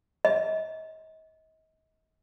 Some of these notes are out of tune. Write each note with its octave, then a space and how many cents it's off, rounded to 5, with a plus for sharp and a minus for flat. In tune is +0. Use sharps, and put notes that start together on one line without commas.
D#5 +35